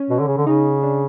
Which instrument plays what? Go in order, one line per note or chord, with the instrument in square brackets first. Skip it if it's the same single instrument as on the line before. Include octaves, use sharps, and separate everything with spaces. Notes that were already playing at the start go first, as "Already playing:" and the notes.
Already playing: [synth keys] C#4
[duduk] B2
D3
C#3
D3
[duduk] C#3 [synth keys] D#4
[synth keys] D4